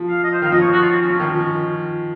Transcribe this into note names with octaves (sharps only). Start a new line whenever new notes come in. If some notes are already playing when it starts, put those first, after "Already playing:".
Already playing: F3
F5
D#5
C5
D#3 F5
F3 D#5
C#5
F#4
F4
C4
C#4
F3
D#3
F3